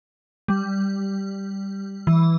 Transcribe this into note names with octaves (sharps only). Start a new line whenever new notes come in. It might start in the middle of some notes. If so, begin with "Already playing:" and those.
G3
E3